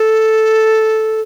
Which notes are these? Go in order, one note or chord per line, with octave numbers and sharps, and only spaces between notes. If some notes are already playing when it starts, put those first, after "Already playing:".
Already playing: A4